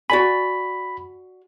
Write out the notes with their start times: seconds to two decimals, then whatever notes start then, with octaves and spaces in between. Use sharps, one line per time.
0.10 F#4 D5 G#5 B5